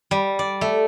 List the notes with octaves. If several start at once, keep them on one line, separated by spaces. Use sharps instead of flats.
G3
D5
A3